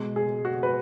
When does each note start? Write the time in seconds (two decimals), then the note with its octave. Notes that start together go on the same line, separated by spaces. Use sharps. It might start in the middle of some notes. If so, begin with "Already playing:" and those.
Already playing: B2 G#3
0.16 G#4
0.45 F#4
0.63 B4